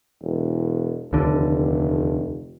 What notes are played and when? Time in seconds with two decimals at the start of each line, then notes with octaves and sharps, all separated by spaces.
0.22 E1
1.13 F1 D#2 D3